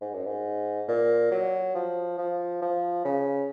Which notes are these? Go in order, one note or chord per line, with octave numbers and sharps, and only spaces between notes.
G#2
F#2
G#2
A#2
F#3
F3
F3
F3
C#3